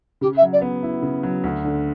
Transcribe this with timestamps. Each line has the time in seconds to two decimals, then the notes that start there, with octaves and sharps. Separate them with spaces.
0.21 C#3 G4
0.37 E5
0.42 F#3
0.52 D5
0.61 B3
0.83 E4
1.02 C#3
1.23 F#3
1.44 D2
1.64 D3